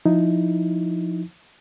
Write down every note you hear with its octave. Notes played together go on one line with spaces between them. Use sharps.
F3 D#4 E4